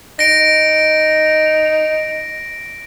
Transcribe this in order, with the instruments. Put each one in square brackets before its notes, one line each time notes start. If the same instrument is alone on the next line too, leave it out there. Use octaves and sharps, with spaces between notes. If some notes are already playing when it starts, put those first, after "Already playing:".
[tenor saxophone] D#4 [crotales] A#6 D7